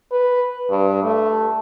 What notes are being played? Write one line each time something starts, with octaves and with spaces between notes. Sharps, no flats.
B4
G2
A3